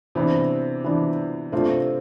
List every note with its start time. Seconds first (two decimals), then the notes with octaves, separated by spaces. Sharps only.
0.15 C3 E3 B3 C4 D4
0.84 E3 B3 D4
1.52 C3 A3 C4 D4 F4